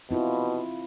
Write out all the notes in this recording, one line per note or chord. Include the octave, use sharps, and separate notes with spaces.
B2 C4 E4 F4